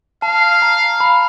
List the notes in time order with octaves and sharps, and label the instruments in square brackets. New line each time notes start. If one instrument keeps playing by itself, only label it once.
[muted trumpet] F5 [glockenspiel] A5
[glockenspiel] A#5
B5